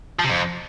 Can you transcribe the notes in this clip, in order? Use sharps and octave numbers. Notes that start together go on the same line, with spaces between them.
F3
C3
F2